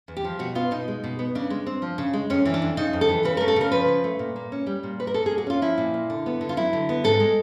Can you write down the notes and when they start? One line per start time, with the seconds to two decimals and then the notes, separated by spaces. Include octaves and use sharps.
0.08 E2
0.17 G4
0.24 F3
0.39 B2 F#4
0.55 B3 F4
0.71 B2 D#4
0.88 G#3
1.04 B2
1.19 B3
1.35 C#3 D4
1.50 G#3
1.67 C4
1.82 F3
1.98 C#3
2.13 G#3
2.30 F2 C#4
2.45 E3
2.54 D4
2.62 F2
2.77 C#3 D#4
2.93 F2
3.01 A4
3.09 E3
3.24 C#3 B4
3.37 A3 A#4
3.48 A4
3.56 C#3 A#4
3.72 F3 B4
3.88 C#3
4.04 A3
4.19 A#2
4.36 A#3
4.52 C#4
4.67 G3
4.83 A#2
4.99 A#3 B4
5.07 A#4
5.14 A#2 A4
5.26 G#4
5.31 A#3
5.38 F#4
5.47 C#4 F4
5.62 F3 E4
5.78 A#2
5.94 A#3
6.10 D3
6.26 B3
6.41 D3
6.49 F4
6.57 F#3 E4
6.73 D3
6.89 B3
7.04 G#2 A4
7.20 G#3